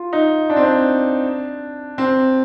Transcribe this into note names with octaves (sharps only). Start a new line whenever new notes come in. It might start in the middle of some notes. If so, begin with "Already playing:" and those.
Already playing: F4
D#4
D4
C4
D4
C4